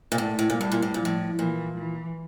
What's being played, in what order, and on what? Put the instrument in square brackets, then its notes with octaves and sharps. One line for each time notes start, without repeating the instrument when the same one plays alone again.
[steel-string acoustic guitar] A#2
[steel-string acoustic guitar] A2 [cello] A3
[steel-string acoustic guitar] A2
A#2
[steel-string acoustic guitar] A2 [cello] G3
[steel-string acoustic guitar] A#2
A2
[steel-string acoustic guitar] A#2 [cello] F3
[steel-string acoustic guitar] A2
[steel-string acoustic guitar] A#2 [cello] E3
[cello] E3